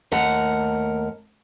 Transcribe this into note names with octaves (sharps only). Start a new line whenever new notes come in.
D#2 A3 A#4 F#5